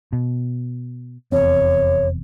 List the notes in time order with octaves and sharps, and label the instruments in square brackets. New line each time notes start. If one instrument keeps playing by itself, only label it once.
[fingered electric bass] B2
[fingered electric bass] F1 E2 C4 [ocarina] C#5